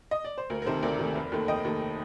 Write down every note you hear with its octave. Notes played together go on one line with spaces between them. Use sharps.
D#5
D5
C5
D2 A#4
A#4
C3 D#3 A3 A4 C5
D2 A#4 D5
C3 D#3 A3
F1
D#2 D#3 A3
F1 D#5 G5
D#2 D#3 A3